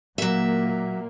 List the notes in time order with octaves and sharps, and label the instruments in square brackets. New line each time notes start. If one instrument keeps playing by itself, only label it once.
[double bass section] A#2 A#3 [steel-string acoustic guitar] F#3 E5